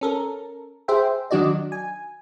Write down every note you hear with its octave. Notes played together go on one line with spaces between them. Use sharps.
C#4 A4 A#4
G#4 C5 E5 G5
D#3 F#3 D4 F#4 D5 D#5
G#5